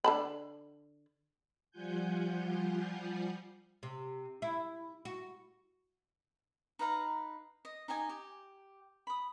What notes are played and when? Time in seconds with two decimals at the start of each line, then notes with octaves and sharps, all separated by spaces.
0.04 D3 A5 B5
1.71 F3 G3 F4 F#5 G#5 G6
3.83 C3
4.42 E4
5.05 F#4
6.79 D#4 B4 F5 A#5
7.65 D#5
7.88 D#4 G4 D#5 G#5
8.09 G4
9.07 B5 D#6